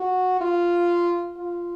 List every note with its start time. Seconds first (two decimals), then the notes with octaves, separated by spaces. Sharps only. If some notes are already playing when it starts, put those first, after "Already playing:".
Already playing: F#4
0.41 F4
1.37 F4